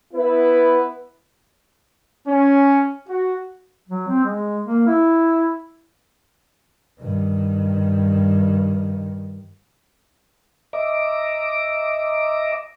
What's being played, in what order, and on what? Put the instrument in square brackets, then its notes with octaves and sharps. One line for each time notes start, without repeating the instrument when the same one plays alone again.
[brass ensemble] B3 E4 B4
C#4
F#4
[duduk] F#3
C4
G#3
A#3
E4
[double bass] G2 D#3
[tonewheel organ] D#5 E5 A#5 D6